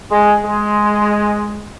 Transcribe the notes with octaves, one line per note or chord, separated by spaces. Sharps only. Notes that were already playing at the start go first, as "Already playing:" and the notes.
G#3
G#3